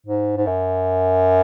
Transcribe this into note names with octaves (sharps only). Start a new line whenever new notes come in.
G#2
G#2
F#2